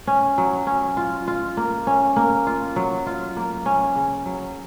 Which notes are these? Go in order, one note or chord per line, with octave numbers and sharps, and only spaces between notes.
C#4
F#3
C#4
F4
F4
A#3
C#4
A#3
F4
F#3
F4
A#3
C#4
C#3
F#3